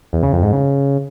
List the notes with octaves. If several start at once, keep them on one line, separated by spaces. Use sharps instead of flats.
E2
C#3
F2
G#2
C#3